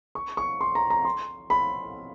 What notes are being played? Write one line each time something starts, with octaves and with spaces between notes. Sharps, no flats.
C#6
C#6
C6
A#5
A#5
C6
B5